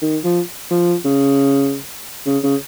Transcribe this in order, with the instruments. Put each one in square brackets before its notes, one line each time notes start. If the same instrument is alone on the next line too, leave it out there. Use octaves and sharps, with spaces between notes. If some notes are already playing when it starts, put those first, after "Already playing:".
[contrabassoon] D#3
F3
F3
C#3
C#3
C#3